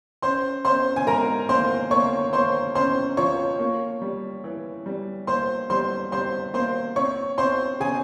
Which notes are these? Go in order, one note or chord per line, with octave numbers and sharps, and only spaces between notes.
C#4 C5 C6
C#4 C5 C6
G#5
G#2 A#4 A#5
A#3 C5 C6
A#3 C#5 C#6
A#3 C5 C6
C#4 C5 C6
F3 C#5 C#6
A#3
G3
E3
G3
A#3 C5 C6
G3 C5 C6
G3 C5 C6
A#3 C5 C6
C4 C#5 C#6
C4 C5 C6
C#3 G#4 G#5